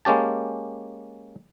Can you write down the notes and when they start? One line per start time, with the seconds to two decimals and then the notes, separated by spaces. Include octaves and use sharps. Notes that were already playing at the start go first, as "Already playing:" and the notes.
0.05 G#3 A#3 C#4 G4 A5